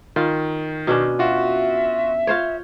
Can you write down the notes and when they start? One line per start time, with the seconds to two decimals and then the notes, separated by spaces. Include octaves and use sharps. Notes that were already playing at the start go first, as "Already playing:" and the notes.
0.16 D#3 F4
0.87 B2 C#4 D4
1.19 F4 F#4 E5
2.27 F4 C5 C#5